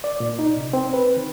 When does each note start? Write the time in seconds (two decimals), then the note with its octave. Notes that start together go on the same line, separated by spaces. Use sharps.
0.04 D5
0.20 A#2
0.39 D#4
0.56 C3
0.73 C4
0.94 B4
1.16 D#3